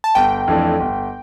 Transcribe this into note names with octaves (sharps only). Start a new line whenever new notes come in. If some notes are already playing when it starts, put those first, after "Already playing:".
A5
G1 G5
F2 E3 A3 D4
G1